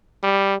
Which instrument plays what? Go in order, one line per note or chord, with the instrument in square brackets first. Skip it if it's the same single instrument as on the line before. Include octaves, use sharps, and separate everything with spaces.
[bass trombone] G3